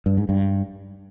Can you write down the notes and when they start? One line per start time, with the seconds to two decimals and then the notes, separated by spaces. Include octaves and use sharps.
0.06 G2
0.17 G#2
0.29 G2